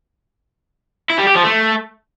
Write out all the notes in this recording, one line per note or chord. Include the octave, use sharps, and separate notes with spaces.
E4
G3
G4
F3
A3